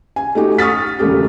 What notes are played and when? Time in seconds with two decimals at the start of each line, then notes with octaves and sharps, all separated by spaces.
0.16 G#5
0.35 A3 D#4 F#4 G4
0.58 C#6 D#6 F6 A6 B6
0.99 E1 C#2 A3 G4